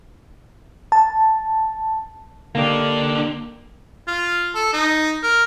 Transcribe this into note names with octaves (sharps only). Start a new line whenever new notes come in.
A5
D3 A#3 D4 G4
F4
A4
D#4
A#4